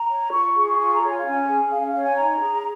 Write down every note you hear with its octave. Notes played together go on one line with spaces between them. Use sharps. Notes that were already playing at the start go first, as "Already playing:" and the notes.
Already playing: A#5
C#5
F4 C#6
G#4
F4 C#6
A#5
C#5
G#5
F5
C#4 G#5
G#4
C#4 F5
F5
C#5 F5
G#5
D#4 A#5
G#4